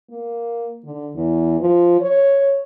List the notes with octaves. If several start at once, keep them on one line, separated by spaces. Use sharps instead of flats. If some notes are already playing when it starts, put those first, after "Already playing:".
A#3
D3
E2
F3
C#5